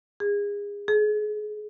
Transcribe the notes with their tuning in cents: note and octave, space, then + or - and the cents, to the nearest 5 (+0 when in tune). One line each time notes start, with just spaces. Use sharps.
G#4 -30
G#4 +30